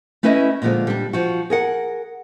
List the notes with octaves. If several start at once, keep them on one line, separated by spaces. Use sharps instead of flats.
A3 C#4 E4 B4 D#5 E5
A#2 D3 F3 G#3
G3 D4
F3 F#4
G#4 A#4 F#5